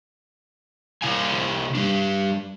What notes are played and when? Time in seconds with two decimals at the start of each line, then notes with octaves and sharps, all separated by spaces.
1.02 C3 E4 F5 G#5
1.75 G3 D4